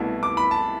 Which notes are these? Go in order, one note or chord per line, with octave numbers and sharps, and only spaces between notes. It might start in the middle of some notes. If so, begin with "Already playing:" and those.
Already playing: C2 B2 A3 E4
D6
B5
A5